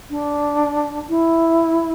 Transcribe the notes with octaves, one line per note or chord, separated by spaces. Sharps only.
D4
E4